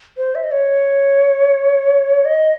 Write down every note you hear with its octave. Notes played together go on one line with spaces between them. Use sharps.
C5
E5
D#5
C#5
D#5